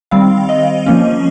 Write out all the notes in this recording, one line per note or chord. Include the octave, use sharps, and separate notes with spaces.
D#3 G3 C4 F5
D#5
F3 A#3 C#4